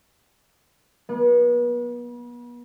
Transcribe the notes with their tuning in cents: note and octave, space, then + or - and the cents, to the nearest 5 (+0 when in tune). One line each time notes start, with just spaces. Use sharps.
B3 -40